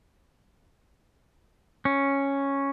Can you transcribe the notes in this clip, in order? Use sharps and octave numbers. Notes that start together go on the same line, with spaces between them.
C#4